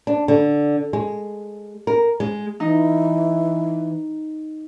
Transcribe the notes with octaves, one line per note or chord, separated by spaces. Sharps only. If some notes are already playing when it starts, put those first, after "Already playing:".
D4
D3
G#3
A#4
G#3
E3 D#4